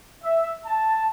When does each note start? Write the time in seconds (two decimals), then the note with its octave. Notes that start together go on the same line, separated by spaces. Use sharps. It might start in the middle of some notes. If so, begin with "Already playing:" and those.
0.23 E5
0.66 A5